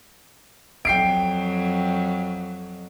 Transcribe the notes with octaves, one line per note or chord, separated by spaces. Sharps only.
F2 F#3 G5 C7 D7